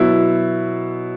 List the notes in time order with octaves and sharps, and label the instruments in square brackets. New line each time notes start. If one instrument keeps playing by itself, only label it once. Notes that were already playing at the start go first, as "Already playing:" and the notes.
Already playing: [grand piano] B2 F#3 E4